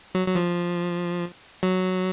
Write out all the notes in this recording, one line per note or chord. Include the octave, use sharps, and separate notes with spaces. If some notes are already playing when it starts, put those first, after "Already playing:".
F#3
F#3
F3
F#3